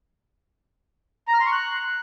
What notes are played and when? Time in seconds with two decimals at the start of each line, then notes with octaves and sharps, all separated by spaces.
1.28 A#5
1.34 F6
1.40 C6
1.46 C#6
1.52 F#6